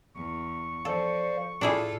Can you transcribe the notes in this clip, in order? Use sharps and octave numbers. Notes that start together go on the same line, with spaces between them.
E2 C#6
F3 A4 C5 D5 F5
A2 D4 E4 F4 G#4 A4